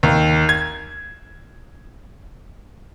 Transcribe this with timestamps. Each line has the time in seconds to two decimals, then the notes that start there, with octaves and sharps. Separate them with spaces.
0.03 D#2
0.49 G#6